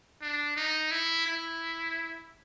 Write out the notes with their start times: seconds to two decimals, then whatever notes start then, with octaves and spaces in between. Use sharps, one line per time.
0.22 D4
0.56 D#4
0.91 E4
1.26 E4